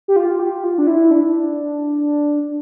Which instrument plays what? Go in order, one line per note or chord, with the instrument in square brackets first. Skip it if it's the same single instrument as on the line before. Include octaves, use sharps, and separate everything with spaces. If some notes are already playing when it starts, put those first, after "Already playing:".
[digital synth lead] G4
F4
G4
F4
D4
E4
D4